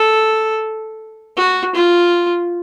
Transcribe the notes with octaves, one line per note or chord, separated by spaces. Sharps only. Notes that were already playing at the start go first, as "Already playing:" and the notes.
Already playing: A4
F#4
F4